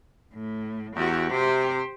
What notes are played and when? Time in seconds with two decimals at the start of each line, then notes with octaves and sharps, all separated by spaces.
0.34 A2
0.96 E2 F#4 G4
1.31 C3 G4 C5